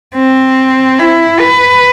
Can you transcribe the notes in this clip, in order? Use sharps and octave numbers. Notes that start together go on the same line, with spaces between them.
C4
E4
B4